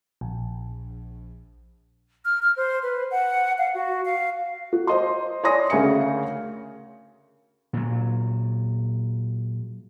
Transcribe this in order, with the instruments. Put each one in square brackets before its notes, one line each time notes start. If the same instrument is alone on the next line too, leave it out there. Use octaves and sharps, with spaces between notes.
[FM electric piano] A#1
[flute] F6
F6
C5
B4
F#5
F5
F#4
F5
[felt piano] F#4
C5 D#5 C6
C#5 D5 G#5 C6 D#6 A#6
D2 C#3 A#4 E5 G#5 C#7
[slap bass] A#2 F#3